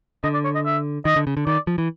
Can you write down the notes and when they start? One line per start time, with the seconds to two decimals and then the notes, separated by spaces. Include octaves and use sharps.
0.23 D3 D#5
0.34 D5
0.44 C#5
0.55 D#5
0.65 E5
1.05 D#3 D#5
1.16 D3
1.27 C#3
1.37 D3
1.47 D#3 D5
1.67 F3
1.78 E3